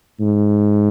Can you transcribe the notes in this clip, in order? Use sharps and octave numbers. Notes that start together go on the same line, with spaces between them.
G#2